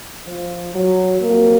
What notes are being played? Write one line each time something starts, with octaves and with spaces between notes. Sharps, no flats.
F3
F#3
F2 F3 F#3 A#3